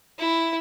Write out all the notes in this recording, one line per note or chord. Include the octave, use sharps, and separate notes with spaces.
E4